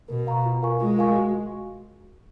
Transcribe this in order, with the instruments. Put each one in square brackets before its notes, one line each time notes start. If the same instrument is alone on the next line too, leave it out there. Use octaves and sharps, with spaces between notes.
[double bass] B2 [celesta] A#4
[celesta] F5 A#5 C#6
F4
A#4 F5 G#5 C#6
[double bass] G#3 [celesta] F4
[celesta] A#4 F5 G#5 C#6
F#4